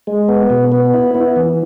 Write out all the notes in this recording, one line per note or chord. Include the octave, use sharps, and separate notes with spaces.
G#3
B3
B2
B3
E4
B3
E3